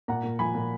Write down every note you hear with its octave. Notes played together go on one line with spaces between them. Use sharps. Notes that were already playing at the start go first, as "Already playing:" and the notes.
A#2 F#5 A#5
A#2
F3 G#5 B5
A#2